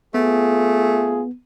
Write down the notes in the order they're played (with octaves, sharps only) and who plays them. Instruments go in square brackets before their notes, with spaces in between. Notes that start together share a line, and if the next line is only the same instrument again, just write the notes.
[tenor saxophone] A3 [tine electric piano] B3 [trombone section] F4 G#4